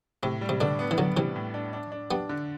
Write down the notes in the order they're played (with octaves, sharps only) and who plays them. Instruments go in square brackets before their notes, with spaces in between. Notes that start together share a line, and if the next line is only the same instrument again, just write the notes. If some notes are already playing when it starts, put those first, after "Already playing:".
[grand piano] A2 [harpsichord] C3
[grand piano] G3
[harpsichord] C3
[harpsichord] B2 D3 [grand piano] D4
[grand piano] B3
[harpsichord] E3
[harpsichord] D3 F#3 [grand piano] B3
[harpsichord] C3 E3 [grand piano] G3
[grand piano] A2
D4
D4
D4
[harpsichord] G3 B3 [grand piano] D4
[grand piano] D3